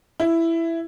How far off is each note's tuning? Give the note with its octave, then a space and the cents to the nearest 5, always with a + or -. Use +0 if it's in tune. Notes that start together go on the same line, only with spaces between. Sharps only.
E4 +10